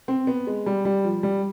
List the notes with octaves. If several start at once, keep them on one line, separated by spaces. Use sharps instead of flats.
C4
B3
G#3
G3
G3
F3
G3